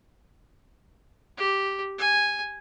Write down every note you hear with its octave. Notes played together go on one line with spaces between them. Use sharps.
G4
G#5